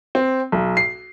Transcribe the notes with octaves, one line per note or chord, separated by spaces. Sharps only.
C4
B1
C7